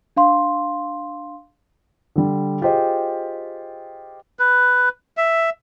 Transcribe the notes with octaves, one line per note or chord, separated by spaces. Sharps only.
D4 F5 C6
D3 G3
F4 G4 G#4 C5 D#5
B4
E5